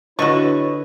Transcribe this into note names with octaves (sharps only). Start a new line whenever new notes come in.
D3 E4 F#4 B4 C#5 D#5 C#6